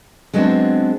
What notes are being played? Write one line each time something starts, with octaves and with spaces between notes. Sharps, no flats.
F#3 G#3 B3 C4 D4